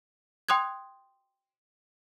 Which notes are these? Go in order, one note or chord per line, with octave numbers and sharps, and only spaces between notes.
G5 C6 D#6 F#6 G#6